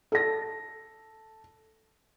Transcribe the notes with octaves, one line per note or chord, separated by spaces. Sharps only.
A4 A#6